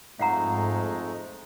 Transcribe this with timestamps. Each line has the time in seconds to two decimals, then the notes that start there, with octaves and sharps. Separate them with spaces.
0.19 F2 G#2 G#3 A3 D#4 F5 F#5 A#5